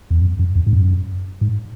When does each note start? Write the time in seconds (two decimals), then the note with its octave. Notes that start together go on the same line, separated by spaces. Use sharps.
0.11 E2
0.21 F#2
0.39 F#2
0.55 E2
0.66 G#2
0.73 F#2
1.41 G#2